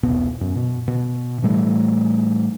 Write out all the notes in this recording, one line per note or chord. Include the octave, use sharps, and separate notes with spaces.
E1 C2 B2 B3
F#2
B2
B2
A2 E3 G3 A3